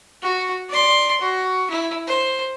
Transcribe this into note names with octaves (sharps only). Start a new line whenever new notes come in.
F#4
D5 C6
F#4
E4
C5